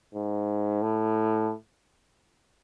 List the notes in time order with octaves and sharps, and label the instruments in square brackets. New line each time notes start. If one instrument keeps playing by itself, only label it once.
[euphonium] G#2
A2